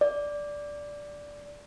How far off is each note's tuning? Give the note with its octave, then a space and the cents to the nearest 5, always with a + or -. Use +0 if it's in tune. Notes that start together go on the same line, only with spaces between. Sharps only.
D5 -5